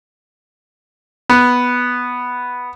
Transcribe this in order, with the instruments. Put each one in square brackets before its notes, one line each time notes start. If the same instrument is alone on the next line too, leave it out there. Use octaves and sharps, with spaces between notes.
[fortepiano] B3